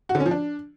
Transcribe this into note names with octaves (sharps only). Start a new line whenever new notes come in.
F#4
D3
C#4
F3
D4